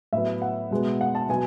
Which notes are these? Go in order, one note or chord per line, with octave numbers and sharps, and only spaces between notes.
A2 F#3 B3 E5
F#5
B2 G#3 B3
F#5
A5
B2 F#3 B3 G#5